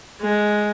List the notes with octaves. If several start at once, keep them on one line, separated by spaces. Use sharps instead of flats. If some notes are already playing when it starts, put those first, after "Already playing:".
G#3